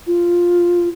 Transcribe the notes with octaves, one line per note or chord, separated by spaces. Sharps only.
F4